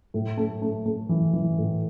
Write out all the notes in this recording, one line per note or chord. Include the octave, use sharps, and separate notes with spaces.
A2
A3
A3
A3
E3
E3
A2